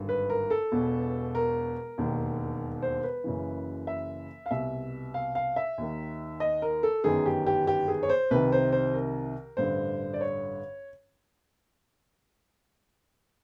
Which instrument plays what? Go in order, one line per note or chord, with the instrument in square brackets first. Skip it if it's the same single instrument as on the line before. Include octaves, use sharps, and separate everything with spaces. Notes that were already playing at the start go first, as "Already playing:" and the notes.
Already playing: [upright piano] G#1 G2 D3
B4
A#4
A4
E1 E2 B2
A#4
E1 D#2 D#3
C5
B4
F#1 F#2 C#3 E3
E5
F5
C2 B2 E5
F5
F5
E5
D#2 D#3
D#5
A#4
A4
G1 F#2 D#3 G#4
G4
G4
G4
G#4
C#5
C5
C2 C3 D#3 B4
C5
C5
A#4
A1 G2 D3 C5
D5
C#5